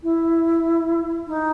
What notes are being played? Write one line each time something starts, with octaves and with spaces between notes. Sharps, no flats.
E4
D#4